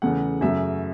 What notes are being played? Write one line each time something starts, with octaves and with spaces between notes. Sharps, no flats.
E2 C#3 A3 F#5
F#2 C#3 F#3 A3 E5